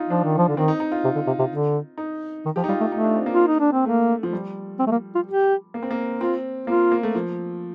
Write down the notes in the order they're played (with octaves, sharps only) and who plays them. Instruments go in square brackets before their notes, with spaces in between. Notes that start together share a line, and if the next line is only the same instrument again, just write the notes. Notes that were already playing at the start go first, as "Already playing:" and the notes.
Already playing: [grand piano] D#4 F4
[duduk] F3 [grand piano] D4
[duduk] D#3
F3
D3
[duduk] D#3 [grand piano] C4
[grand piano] D#4
D#4
F4
[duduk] C3
D3
C3
C3
D3
[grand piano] D#4
[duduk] D#3
[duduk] F3 [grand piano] G4
[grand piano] D#4
[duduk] G3 [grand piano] F4
[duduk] A3 [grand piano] F4
[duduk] A3 [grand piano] D#4
[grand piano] D4
C4
A#3
[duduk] F4
D#4
D4
C4
[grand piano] A3 [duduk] A#3
[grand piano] F3
G3
[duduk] C4
A3
A#3
F4
G4
[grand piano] A#3
C4
A#3
[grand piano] C4 [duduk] F4
[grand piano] A#3 [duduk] F4
[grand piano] A#3
A3
F3